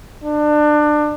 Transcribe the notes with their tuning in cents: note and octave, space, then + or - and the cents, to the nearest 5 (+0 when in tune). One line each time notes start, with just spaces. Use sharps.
D4 +25